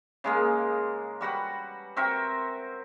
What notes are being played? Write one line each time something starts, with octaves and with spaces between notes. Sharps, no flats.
C#3 G#3 A#3
G3 F#4 B4 F#5
C4 F#4 A#4 E5